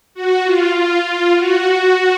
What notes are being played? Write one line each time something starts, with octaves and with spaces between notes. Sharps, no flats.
F#4
F4
F4
F4
F#4